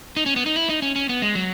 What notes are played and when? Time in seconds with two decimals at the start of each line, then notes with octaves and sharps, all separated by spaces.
0.17 D#4
0.26 C#4
0.36 B3
0.46 D#4
0.56 E4
0.69 D#4
0.82 C#4
0.96 C#4
1.09 B3
1.22 G#3
1.35 F#3